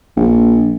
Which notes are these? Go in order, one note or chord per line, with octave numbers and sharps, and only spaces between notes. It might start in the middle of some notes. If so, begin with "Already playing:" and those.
A#1